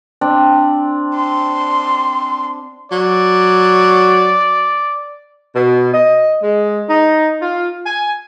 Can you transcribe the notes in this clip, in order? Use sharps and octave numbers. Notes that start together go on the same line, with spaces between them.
C4 D4
C6
F#3 D5
B2
D#5
G#3
D#4
F4
G#5